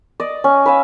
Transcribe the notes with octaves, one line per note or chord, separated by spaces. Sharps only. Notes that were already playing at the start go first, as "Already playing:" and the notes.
D5 D#5
C#4
B4 F5 G#5 E6